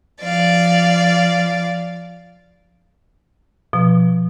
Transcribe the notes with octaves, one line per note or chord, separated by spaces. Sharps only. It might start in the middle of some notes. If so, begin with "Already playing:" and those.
F3 D5 F5
B2 F3